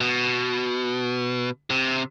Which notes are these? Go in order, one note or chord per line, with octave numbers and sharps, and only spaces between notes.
B2
C3